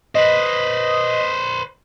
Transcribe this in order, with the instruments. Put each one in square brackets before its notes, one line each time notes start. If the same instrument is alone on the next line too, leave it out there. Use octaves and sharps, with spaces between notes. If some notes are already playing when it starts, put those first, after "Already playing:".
[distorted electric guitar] B4 C5 [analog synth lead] D#5